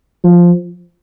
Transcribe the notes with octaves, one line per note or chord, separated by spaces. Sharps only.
F3